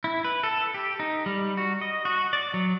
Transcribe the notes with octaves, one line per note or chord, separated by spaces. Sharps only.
E4
B4
A4
G4
D#4
G3
F#4
D#5
F#4
D5
F#3